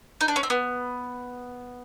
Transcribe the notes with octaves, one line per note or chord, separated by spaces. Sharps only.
D#4
D4
C#4
C4
B3